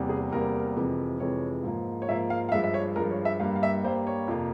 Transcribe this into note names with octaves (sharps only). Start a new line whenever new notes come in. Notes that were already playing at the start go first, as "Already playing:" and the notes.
Already playing: E2 C3 G3 A#3
G#4
E2 C3 G3 A#3 A#4
F2 C3 E3 G#3
F2 C3 E3 G#3 C#5
G#2 F3 A#3
C#5
G#2 F3 A#3 E5
F5
F5
G2 F3 G#3 E5
E5
C#5
G2 F3 G#3 A#4
C#5
E5
G2 G3 A#3 F5
F5
E5
G2 G3 A#3 C5
C#5
F2 C3 F3 A#3